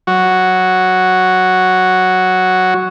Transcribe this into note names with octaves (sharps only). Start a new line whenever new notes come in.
F#3 F#4